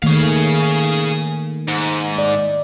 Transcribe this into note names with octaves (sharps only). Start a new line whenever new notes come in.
D#3 A3 A#3 G#4 F5
G#2
D5